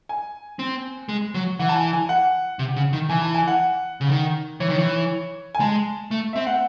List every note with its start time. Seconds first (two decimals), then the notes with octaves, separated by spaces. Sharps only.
0.09 G#5
0.59 C4
1.09 G#3
1.34 F#3
1.59 E3 F#5
1.69 A5
1.76 G#5
1.93 G#5
2.09 F#5
2.59 C3
2.76 C#3
2.93 D#3
3.09 E3 G#5
3.22 A5
3.34 G#5
3.48 F#5
4.01 C#3
4.10 D#3
4.60 E3 C#5
4.69 D#3
4.79 E3
5.55 G#5
5.60 G#3 A5
6.11 A3
6.33 C4 E5
6.47 F#5